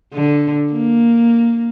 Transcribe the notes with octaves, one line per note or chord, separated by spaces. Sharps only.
D3
A#3